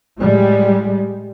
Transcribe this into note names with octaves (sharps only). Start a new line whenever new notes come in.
A2 G3 G#3